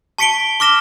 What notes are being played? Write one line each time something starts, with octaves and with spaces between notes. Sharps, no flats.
A5 C#6 B6 C#7 D7 G7
C#6 D6 F6 A#6 E7